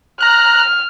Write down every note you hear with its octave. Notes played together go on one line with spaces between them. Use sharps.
A#5 F6 F#6